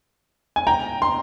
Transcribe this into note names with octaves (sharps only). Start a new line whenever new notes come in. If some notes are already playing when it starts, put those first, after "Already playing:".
G#5
G5 A#5
C6